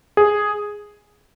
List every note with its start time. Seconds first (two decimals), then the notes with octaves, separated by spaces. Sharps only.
0.17 G#4